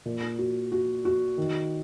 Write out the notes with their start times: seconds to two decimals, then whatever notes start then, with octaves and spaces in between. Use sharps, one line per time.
0.06 A#2
0.39 F#4
0.72 F#4
1.05 F#4
1.37 D#3